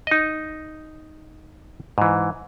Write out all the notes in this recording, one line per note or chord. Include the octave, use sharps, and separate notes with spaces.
D#4 D#5
G#2 E3